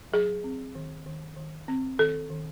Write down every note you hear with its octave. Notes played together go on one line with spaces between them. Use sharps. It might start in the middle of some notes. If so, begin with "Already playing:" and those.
F#3 G#4
C4
D#3
D#3
D#3
C4
D#3 A4
D#3